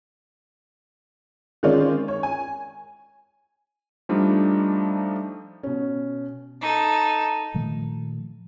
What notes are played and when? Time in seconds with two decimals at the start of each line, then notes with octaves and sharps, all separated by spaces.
1.63 D#3 G#3 C4 C#4 F4 D5
2.08 C#5
2.23 G#5
4.09 F3 G3 A3 D4 D#4
5.63 B2 C#4
6.61 D#4 A4
7.54 A#2 D#3 F3 A3